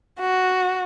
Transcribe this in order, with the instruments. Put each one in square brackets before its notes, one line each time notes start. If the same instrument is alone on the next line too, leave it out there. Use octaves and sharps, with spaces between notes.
[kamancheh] F#4